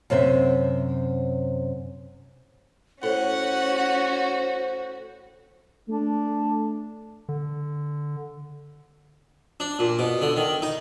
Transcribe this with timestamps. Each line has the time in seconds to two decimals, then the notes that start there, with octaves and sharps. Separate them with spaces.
0.10 F#2 C3 C5 E5
3.03 A2 C#4 F#4 C5 F#5
5.89 A3 D4
7.29 D3
9.60 D4
9.79 A#2
9.99 B2
10.22 D3
10.36 D#3
10.62 D#4